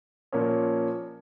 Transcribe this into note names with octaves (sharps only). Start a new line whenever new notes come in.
A#2 F3 A#3 C#4